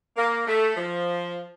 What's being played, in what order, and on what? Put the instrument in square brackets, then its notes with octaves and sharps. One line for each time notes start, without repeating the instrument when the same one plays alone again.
[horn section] A#3
A3
F3